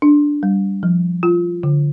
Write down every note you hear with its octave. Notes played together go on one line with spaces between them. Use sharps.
D4
G3
F3
F4
D3